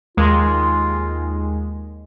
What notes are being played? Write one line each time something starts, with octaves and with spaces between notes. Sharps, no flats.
D#2 G#3 F4